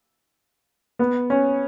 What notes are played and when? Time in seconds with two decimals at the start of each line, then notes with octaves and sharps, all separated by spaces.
0.99 B3
1.30 C#4